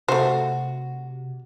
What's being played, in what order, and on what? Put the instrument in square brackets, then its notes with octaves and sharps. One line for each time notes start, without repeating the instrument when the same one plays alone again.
[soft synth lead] C3 [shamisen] A3 C5 [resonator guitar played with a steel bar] F#4